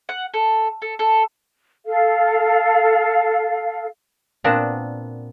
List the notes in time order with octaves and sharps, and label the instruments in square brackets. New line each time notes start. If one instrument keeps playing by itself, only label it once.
[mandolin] F#5
A4
A4
A4
[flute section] A4 F5
[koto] A#2 B3 C4 D4 F#5